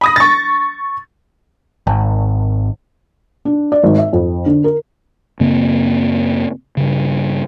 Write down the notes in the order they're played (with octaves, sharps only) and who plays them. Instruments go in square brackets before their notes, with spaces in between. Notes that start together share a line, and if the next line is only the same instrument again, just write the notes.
[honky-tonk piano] B5 D#6 A#6
C#6 A6
[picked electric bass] G#1
[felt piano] D4
D5
G#1
E5
F2
D3
A#4
[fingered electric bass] F#2 C#3 A#3 C4
G2 C#3